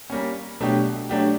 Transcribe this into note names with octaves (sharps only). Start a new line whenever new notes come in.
G3 A#3 C#4
B2 F#3 A3 D4 G4
F#3 A3 D4 G4